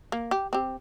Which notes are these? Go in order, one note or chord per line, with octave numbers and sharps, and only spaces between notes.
A#3
G4
C4 G4